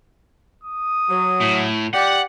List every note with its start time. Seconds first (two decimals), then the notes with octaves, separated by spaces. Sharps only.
0.64 D#6
1.10 F#3
1.41 A2
1.94 G4 D5 F#5